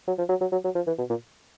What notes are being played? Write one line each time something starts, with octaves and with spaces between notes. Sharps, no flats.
F#3
F3
F#3
F#3
F#3
F#3
F3
E3
B2
A#2